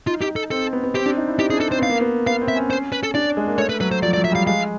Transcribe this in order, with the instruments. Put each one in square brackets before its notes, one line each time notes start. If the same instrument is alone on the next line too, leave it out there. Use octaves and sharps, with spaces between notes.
[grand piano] D#4 [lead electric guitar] F4
[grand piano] D#4 [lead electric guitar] G4
[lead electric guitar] A4
[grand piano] C4 [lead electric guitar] A4
[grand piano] B3
B3
[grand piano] C4 [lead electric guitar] G4
[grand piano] D4
D#4
E4
[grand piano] D#4 [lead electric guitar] G4
[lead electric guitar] G#4
[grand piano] D4
[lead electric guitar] A4
[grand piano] C4 [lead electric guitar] C5
[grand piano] B3 [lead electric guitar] F5
[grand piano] A#3
B3
[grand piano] B3 [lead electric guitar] F5
[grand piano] C4
[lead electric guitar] E5
[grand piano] C#4
[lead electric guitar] C5
B4
A4
[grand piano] D4 [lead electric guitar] D5
[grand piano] G#3
A#3
[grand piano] A3 [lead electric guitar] C#5
[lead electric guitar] B4
[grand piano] F#3 [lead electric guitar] B4
[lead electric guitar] C5
[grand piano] F3 [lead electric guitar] D5
[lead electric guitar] D5
[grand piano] F#3
[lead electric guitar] E5
[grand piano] G3 [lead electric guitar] F5
[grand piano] G#3 [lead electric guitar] F5